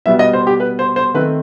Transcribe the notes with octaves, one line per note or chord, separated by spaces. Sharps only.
B2 G3 B3 E5
D#5
C5
G4
B4
C5
C5
D#3 A3 C4 B4